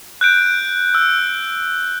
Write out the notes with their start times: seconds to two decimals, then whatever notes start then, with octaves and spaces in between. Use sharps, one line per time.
0.21 F#6 G6 D7
0.94 E6